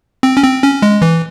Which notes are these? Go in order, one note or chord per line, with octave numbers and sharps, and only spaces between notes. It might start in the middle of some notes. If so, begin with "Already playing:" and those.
C4
C#4
C4
C#4
G#3
E3